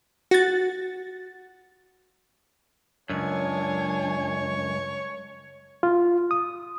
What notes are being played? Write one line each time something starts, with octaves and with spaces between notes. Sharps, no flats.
F#4 A6
C#2 F#2 D4 C#5 G#5
F4
D#6